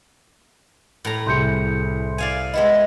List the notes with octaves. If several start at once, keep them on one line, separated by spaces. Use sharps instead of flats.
A2 A#5
C2 G#4 C6 G6 C#7
D5 F5 G#5
G#3 B3 E4 D#5